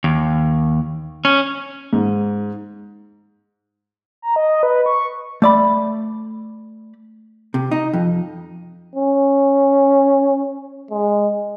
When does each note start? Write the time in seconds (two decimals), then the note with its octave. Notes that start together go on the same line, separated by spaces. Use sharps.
0.04 D#2
1.25 C#4
1.93 G#2
4.22 A#5
4.36 D#5
4.63 B4
4.86 C#6
5.42 A3 D5 B5
7.54 C3
7.71 D#4
7.94 F2
8.95 C#4
10.91 G#3